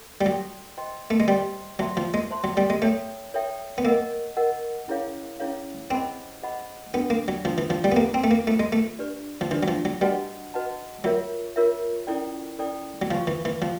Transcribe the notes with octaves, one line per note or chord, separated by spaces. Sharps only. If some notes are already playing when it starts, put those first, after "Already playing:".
Already playing: A4
G3
F#3 A4 D5 G5 C6
C5 D#5 G5 C6
A3
G#3
G3 C5 D#5 G5 C6
F#3 C5 E5 A5 C6
F3
G#3
C5 E5 A5 C6
F#3
G3
G#3
A3 A4 C#5 E5 G5
A4 C#5 E5 G5
B3
A#3 A#4 D#5 F#5
A#4 D#5 F#5
C#4 E4 G#4 C#5 F5
C#4 E4 G#4 C#5 F5
C4 G#4 C5 D#5 F#5 B5
G#4 C5 D#5 F#5 B5
B3 D4 F#4 A4
A#3
F#3
F3 D4 F#4 A4
E3
F3
G3
B3
A#3 F4 A4 C5 E5 A5
C4
A3
A#3
A3 F4 A4 C5 E5 A5
G#3
A3
D4 G4 B4 D5
F3
E3 D4 G4 B4 D5
F#3
F3
F#3
G3 F#4 B4 D#5 F#5 A5
F#4 B4 D#5 F#5 A5
F#3 F4 A#4 C#5 E5
F4 A#4 C#5 E5
C#4 E4 A4 D5 G5
C#4 E4 A4 D5 G5
F#3
F3 C5 F5 G#5 C#6
E3
E3
F3 C5 F5